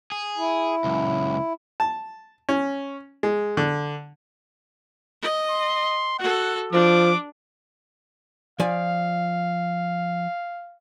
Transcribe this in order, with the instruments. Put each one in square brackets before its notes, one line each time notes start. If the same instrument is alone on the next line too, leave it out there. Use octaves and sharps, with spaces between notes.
[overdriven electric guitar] G#4
[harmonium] E4
[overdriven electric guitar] C#2 F#2
[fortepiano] A5
C#4
G#3
D3
[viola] D#5
[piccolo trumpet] C6
[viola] F#4 A4 [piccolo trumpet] F#5
[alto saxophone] F3 [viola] D4 [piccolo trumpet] D6
[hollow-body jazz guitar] F3 D5 G#5 [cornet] F5